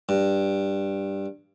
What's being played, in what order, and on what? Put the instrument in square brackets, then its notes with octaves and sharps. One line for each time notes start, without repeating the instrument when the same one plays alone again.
[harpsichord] G2